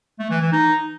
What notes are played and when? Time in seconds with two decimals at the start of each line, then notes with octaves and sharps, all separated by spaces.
0.19 A3
0.30 E3
0.41 E3
0.52 D#4